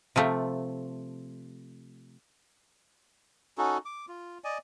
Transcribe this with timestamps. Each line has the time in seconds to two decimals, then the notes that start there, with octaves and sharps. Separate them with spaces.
0.16 C3 F3 A3
3.58 C#4 D#4 F#4 A4
3.85 D6
4.08 F4
4.44 D5 D#5 G#5